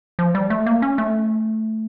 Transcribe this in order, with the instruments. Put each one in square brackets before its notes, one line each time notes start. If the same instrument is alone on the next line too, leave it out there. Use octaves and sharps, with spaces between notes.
[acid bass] F3
G3
A3
A#3
C#4
A3